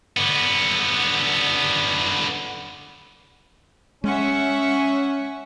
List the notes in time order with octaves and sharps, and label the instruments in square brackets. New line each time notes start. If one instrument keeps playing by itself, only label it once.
[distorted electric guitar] D3 B3
[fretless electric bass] G#3 [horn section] C#4 [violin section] E5 F#5 C#6